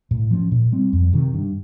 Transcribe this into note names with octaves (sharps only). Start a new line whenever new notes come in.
A2
F3 A3 C#4
A#2
G3 C4
F2
C3 D#3
G2